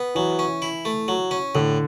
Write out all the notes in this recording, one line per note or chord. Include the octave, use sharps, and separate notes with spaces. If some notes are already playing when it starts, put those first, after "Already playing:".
Already playing: B3
E3 F#3
C#4
E4
A3
F#3
C#4
A2 D3